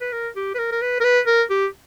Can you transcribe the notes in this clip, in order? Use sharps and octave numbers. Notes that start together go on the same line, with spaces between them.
B4
A#4
G4
B4
A#4
A#4
B4
A#4
B4
A#4
G4